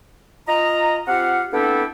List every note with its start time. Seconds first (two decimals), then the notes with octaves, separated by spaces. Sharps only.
0.48 F4 D#5 A#5
1.08 C4 F4 G4 F5 F#5
1.53 B3 C4 D4 E4 G4 A4